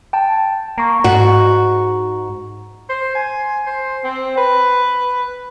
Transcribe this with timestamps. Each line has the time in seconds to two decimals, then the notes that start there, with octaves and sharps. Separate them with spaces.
0.13 G5 A5
0.78 A#3 A#5 C#6
1.04 G#2 F#4
2.89 C5
3.15 G#5
3.66 C5
4.04 C4
4.37 B4